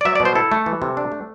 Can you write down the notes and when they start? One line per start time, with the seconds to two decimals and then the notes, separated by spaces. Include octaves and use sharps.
0.01 D5
0.05 F#3 E5
0.15 D5
0.20 B2
0.25 C5
0.35 E4 A4
0.52 A3
0.66 E3
0.82 C3
0.97 D4
1.12 A3